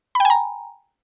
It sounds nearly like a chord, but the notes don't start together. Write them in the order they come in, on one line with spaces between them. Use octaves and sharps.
B5 G5 G#5 A#5